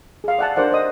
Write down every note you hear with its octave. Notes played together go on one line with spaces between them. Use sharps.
G#4 F5
D5 E5 F#5 G#5 A5
D4 G4 A#4 C5 D5 F#5
C5 D#5 D#6